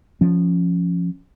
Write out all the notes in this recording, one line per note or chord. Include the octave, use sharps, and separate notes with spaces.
F3 C#4